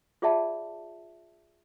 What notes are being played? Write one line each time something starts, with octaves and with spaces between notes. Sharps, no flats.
F4 G#4 D5 E5 F#5 A5